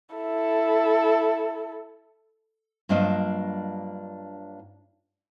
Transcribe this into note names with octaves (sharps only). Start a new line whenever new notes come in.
E4 A4
G2 F#3 A#3 D4 F4 D#5